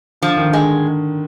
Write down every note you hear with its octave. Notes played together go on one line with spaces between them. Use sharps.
D3 F3
D#3
D3
G#3